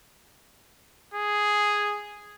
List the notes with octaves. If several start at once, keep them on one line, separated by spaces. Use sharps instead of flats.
G#4